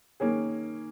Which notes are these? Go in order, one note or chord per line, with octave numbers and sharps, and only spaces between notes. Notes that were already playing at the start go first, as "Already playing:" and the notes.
D#3 A#3 C#4 G#4